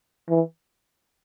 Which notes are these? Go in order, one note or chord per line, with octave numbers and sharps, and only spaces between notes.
E3